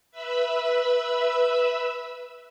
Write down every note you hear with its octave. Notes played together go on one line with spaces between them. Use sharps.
B4 E5 B5 E6